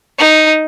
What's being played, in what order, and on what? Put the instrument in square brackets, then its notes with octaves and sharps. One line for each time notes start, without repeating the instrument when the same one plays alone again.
[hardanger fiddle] D#4